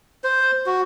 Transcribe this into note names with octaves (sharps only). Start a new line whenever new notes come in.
C5
F#4